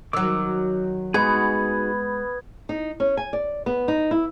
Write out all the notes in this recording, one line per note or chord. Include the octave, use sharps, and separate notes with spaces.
D#3 F#3 D6 E6
G#3 B3 D#4 F#4 G#4 B5 G#6
D#4
C#4
G#5
D5
B3
D#4
E4